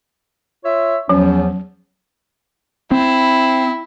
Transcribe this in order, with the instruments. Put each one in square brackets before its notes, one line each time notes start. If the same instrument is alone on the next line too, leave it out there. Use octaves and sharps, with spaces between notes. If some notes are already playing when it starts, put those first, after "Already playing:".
[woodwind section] F4 C#5 E5
[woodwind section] E2 F3 [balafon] F#3 [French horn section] C#4
[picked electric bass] C4 [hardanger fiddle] E4